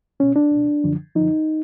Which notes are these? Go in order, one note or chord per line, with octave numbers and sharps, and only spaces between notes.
C#2 B2 C#4
D4
C#2 B2
F#2 D3 F3
F#2 D3 F3 D#4